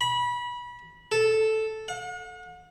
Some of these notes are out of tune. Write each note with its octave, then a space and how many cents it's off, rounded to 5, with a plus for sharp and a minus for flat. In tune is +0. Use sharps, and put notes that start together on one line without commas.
B5 -25
A4 -5
F#5 -45